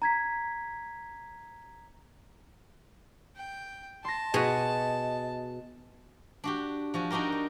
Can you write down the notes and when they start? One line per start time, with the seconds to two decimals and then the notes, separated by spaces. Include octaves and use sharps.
0.02 A#5 G#6 B6
3.36 G5
4.05 A5 C6 A#6
4.34 B2 F#4 G#4 D#5
6.44 D4 F#4 G4
6.94 F3 F#4 G#5
7.11 D4 D#4 F#4 G4 A#4
7.32 F#4